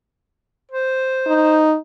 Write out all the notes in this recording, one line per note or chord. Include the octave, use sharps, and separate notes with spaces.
C5
D#4